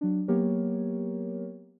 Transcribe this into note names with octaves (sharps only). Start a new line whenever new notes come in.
F#3 D4
F#3 A#3 B3 G4 A#4 C#5